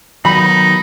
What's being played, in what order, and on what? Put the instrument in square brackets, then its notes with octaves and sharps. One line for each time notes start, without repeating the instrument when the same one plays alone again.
[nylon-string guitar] D#3 F#3 B3 [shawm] D#4 [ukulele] B5